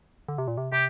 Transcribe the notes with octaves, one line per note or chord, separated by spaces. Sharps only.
D3
C3
A#2
C3
C3 G4